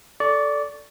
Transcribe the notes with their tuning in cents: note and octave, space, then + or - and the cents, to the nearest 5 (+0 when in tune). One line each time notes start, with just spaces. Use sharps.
A4 +0 D5 -10 C#6 +15